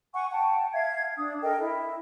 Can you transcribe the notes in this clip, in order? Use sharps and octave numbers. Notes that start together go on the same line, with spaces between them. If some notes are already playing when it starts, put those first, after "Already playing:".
F#5 G#5 C#6
F#5 G5 A5
E5 F5 G#6
D4 D#6
A4 A#4 D#5 G5
E4